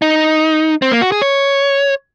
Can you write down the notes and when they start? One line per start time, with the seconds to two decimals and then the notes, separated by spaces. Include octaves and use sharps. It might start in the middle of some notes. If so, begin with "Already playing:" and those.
0.02 D#4
0.82 C4
0.92 A#3
1.01 F#4
1.12 G#4
1.22 C#5